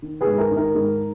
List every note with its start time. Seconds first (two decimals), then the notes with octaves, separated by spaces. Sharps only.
0.02 D#3
0.21 G#4 B4
0.27 G#2
0.38 A#4
0.51 D#3
0.57 A#4
0.75 G#2